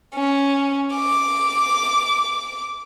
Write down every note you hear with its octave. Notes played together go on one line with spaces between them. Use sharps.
C#4
D6